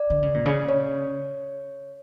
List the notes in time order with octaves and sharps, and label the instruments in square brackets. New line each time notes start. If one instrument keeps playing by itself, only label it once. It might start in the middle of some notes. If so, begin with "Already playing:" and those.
Already playing: [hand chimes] D5
[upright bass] D3
C#3
A#2
C#3
[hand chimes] C#5